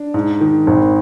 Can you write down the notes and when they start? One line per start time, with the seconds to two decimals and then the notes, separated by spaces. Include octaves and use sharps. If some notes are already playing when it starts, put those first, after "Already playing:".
Already playing: D4
0.14 G#2
0.41 D#3
0.67 G#1